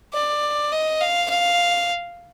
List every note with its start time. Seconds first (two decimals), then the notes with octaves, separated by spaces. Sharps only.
0.14 D5
0.72 D#5
1.01 F5
1.30 F5